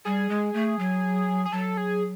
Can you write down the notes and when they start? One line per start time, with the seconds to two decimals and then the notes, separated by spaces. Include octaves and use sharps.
0.05 G3 G#4
0.30 G#3
0.54 A3
0.79 F#3
1.45 G#4
1.52 F#3 A4
1.77 G#4